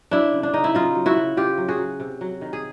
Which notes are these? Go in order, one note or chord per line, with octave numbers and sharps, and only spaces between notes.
F#3 D4 E4
C#3
D4
C#3 D#4
E4
F#3 D#4 F4
F#3
E4 F#4
C#3
C#3 F4 G4
F#3
F#4 G#4
F#3
C3
F#3
D#3
G#4